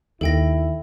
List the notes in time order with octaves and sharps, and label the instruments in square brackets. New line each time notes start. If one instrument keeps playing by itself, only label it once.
[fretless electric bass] D#2 [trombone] E4 [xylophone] A4 G5 A#6